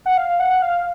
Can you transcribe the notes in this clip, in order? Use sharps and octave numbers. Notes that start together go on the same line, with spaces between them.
F#5
F5
F#5
F5